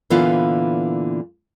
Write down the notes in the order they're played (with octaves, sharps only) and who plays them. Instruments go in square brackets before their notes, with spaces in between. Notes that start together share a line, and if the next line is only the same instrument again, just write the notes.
[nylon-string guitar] A#2 D3 E3 B3 F4 F5